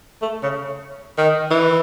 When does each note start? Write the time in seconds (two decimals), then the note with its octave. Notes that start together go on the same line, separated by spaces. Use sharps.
0.22 A3
0.43 C#3
1.18 D#3
1.51 E3